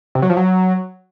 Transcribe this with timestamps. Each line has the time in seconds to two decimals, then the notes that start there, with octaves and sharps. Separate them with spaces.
0.15 C3
0.22 F#3
0.30 F3
0.37 F#3